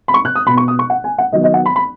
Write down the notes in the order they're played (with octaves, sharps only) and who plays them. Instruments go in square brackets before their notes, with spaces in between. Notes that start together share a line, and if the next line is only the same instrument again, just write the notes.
[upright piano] B5
C#6
F#6
D#6
B2 B5
B3
C#6
D#6
C#6
F#5
G#5
F#5
D#3 F#3 B3 D#5
D#5
F#5
B5
B5